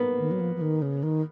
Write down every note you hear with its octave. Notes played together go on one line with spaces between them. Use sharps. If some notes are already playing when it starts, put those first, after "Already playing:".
Already playing: A#3 B3
D#3
F#3
F3
F3
D#3
C#3
D#3